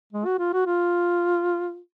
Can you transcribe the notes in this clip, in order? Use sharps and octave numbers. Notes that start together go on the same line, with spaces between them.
G#3
F#4
F4
F#4
F4